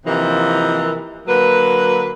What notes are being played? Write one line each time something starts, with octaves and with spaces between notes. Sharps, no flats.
C3 E3 F3 A#3 D#4 A#4
D3 F#3 A#3 B4